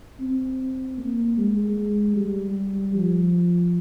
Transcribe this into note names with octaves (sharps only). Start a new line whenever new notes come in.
C4
A#3
G#3
G3
F3